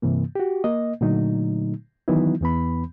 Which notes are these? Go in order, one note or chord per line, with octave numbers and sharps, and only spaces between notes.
G2 C3 E3 A#3
F#4 G4
A#3 D#5
A#2 D3 F#3 A3 D#4
D#3 E3 F#3 B3 D#4 E4
E2 E3 B3 B5